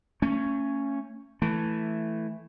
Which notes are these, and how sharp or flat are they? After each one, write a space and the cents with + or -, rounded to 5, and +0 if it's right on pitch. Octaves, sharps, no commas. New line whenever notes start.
A3 +40 C#4 +0
E3 +0 A3 +0